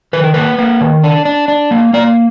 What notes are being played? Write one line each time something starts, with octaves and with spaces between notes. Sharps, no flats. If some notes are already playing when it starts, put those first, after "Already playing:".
D#3 B4
A#4
A#3 B4
A#3
D#3
D4
D4
D4
A#3
A#3 D5